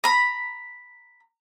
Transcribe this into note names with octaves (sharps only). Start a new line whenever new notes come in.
A#5 B5